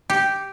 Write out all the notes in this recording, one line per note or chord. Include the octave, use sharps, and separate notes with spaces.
G4